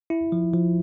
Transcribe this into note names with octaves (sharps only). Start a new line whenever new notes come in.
E4
F3
F3